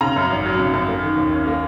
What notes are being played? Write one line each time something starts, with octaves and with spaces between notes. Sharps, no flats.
C#3 A#5
F#2
G#1
F#3
C#3
F#2
A#3
D#3
D#2
C#4
A#3